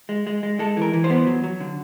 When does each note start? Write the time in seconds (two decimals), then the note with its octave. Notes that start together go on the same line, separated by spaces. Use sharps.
0.09 G#3
0.27 G#3
0.43 G#3
0.59 G#3 A4
0.77 E3 A#4
0.93 E3
1.04 C5
1.10 B3
1.27 F#3
1.44 F#3
1.60 D3